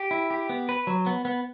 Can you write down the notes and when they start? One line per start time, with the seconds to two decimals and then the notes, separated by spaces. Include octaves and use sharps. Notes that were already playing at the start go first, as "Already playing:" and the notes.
Already playing: G4
0.11 E4
0.31 G4
0.49 B3
0.69 B4
0.87 F#3
1.06 B3
1.25 B3